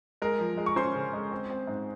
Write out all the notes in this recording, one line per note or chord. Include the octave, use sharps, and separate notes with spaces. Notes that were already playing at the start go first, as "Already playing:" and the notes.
G#3 A#4 A#5
F3
G#3
C#6
C#4 C5 C6
C#3
G#3
C4
C4
G#2